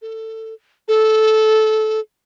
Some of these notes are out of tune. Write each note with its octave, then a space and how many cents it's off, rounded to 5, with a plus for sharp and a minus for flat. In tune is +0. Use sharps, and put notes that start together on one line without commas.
A4 +15
A4 -15